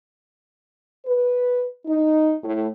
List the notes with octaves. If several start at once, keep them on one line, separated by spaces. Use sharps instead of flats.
B4
D#4
A2